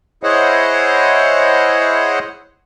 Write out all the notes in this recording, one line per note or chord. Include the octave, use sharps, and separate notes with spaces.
E4 G#4 C5 C#5 D#5 F#5